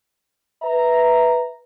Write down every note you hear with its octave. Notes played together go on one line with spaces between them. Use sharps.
B4 E5 A#5